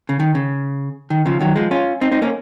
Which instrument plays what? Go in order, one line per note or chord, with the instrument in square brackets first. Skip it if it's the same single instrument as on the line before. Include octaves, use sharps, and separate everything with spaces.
[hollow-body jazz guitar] C#3
D#3
C#3
D#3
C#3 F3
D#3 F#3
F3 G#3
C#4 F4
C4 D#4
C4 D#4
A#3 C#4